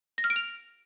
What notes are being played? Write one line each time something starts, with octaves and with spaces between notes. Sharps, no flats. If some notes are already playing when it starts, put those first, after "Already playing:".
A#6
F6
D7
F7